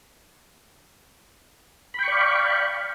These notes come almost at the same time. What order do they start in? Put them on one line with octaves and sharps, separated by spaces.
B5 G5 C#6 D5 F5